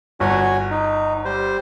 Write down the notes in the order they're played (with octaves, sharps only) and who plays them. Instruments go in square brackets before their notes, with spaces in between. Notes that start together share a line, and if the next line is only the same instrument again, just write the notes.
[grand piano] G1 [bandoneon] F#4 C#5 G#5
[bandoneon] D#4
G3 C5